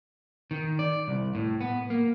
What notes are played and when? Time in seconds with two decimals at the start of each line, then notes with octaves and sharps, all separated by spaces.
0.51 D#3
0.79 D5
1.08 C2
1.35 A2
1.61 B3
1.90 A#3